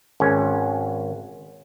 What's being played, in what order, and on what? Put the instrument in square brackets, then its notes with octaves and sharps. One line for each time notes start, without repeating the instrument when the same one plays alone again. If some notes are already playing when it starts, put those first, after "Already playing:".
[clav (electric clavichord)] G#1 C#4